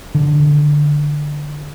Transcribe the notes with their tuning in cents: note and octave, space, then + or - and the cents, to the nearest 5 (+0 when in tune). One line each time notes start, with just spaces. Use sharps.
D3 +5